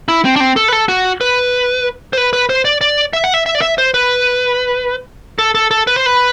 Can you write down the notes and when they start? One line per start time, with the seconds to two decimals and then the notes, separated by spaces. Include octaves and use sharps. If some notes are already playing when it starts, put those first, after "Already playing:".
0.08 E4
0.25 C4
0.36 D4
0.40 C4
0.56 A4
0.69 B4
0.73 A4
0.88 F#4
1.21 B4
2.13 C5
2.17 B4
2.33 B4
2.49 C5
2.65 D5
2.81 D5
3.13 E5
3.24 F#5
3.34 E5
3.46 E5
3.55 D5
3.62 E5
3.78 C5
3.94 B4
5.39 A4
5.55 A4
5.71 A4
5.87 B4
5.96 C5
6.06 B4